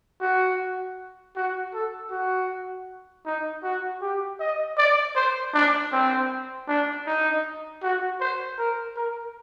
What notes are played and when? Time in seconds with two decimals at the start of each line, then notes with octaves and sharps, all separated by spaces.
0.21 F#4
1.36 F#4
1.74 A4
2.11 F#4
3.26 D#4
3.64 F#4
4.01 G4
4.40 D#5
4.78 D5
5.16 C5
5.54 D4
5.93 C4
6.68 D4
7.07 D#4
7.83 F#4
8.21 C5
8.58 A#4
8.97 A#4